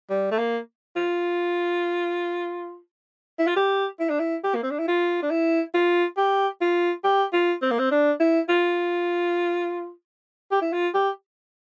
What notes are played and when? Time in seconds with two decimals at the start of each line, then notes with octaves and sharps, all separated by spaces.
0.10 G3
0.31 A3
0.39 A#3
0.96 F4
3.39 E4
3.48 F4
3.56 G4
4.00 E4
4.10 D4
4.20 E4
4.44 G4
4.55 A#3
4.63 C4
4.71 D4
4.79 E4
4.88 F4
5.22 D4
5.31 E4
5.74 F4
6.18 G4
6.61 F4
7.04 G4
7.33 F4
7.62 C4
7.71 A#3
7.79 C4
7.92 D4
8.20 E4
8.49 F4
10.52 G4
10.62 E4
10.73 F4
10.95 G4